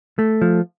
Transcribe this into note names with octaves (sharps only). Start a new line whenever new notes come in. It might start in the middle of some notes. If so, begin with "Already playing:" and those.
A3
F3